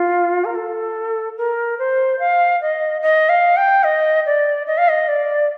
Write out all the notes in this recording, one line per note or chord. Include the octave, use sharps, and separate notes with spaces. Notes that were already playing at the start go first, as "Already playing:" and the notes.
Already playing: F4
A#4
A4
A#4
C5
F5
D#5
D#5
F5
G5
D#5
D5
D#5
F5
D#5
D5